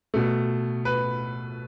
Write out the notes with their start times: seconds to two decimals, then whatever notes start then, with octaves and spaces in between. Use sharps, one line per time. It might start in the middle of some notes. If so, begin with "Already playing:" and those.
0.14 B2 A3
0.85 B4